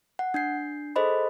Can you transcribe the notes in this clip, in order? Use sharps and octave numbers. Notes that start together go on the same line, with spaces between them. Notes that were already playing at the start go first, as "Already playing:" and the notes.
F#5
D4 G6 C7
G#4 A4 C5 D#5 B5